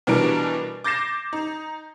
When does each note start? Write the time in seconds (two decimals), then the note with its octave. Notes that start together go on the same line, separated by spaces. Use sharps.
0.07 B2 E3 G3 D4 A#4 D7
0.84 D6 G6 A6 A#6 C7 E7
1.33 D#4